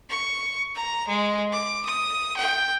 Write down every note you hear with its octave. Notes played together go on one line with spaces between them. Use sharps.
C#6
A#5
G#3
D6
D#6
G5